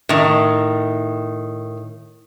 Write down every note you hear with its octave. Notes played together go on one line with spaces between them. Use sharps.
A2 D#3